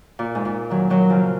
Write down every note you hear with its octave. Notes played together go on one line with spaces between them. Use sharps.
A#2
G#2
A#2
D#3 F#3
D#3 F#3
C#3 F3